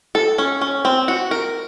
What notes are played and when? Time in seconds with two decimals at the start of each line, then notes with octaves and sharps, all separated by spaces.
0.15 A4
0.38 C#4
0.61 C#4
0.85 C4
1.08 F#4
1.31 A#4